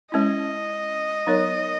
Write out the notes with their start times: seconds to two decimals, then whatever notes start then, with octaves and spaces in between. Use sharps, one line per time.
0.12 G#3 C#4 E4 D#5
1.27 F#3 B3 D#4 A#4 C#5